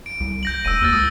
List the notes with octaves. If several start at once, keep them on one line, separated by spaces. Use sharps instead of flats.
D7
C2
G6 A#6 F#7
F1 E6 D#7
D#2 E6 F6 A6
C#2 D#6 A6